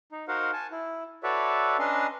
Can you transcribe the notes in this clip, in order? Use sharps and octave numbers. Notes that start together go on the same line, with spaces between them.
D#4
D#4 F#4 A#4 C5 F5 F#5
G#5 A5
E4
F#4 A4 B4 C#5 D5 E5
C#4 D4 B4 D#5 A#5 C6